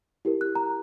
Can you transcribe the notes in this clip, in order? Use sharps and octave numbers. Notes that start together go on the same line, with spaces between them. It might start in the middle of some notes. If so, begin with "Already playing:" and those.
E4 G4 A#4
F#6
A#5